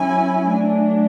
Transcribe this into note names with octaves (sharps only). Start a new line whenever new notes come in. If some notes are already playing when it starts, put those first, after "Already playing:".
Already playing: F#3 C#4 E4 G#5
F#3 A3 D4